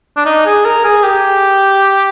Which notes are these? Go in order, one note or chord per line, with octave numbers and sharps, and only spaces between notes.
D4
D#4
G#4
A#4
G#4
G4